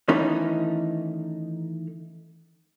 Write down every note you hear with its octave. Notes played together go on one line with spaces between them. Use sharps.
D#3 E3 A3 C#4 D#4